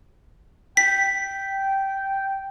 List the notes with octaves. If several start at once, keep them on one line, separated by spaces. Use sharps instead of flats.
G5 B6